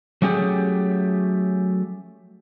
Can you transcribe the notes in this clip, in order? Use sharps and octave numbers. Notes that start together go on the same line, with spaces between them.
F#3 A3 C#4 G4 G#4